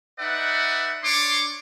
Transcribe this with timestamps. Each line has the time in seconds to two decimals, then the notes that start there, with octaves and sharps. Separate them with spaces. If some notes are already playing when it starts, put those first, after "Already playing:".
0.19 D#4 B4 D5 E5 F#5
1.03 D4 C#5 C6 D6